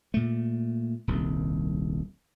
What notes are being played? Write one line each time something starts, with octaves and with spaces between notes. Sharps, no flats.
A#2 A3
D#1 C2 D#3